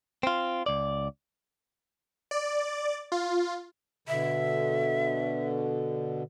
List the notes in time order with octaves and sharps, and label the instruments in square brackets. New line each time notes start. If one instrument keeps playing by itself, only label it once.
[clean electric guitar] C4 F4
C#2 D5
[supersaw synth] D5
F4
[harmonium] B2 D3 [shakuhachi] E5